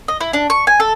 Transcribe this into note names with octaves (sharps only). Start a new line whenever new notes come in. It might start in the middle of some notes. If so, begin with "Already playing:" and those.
D#5
E4
D4
C#6
G#5
A4